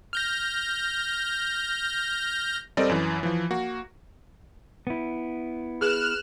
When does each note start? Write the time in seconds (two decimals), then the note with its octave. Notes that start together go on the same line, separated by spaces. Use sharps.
0.13 F6 G6 A#6
2.77 G3 C4 A4 A#4 D5 D#5
2.89 F#2 E3
3.23 E3 F3
3.51 A#3 F#4
4.87 B3 E4
5.81 G#4 B4 F6 F#6 E7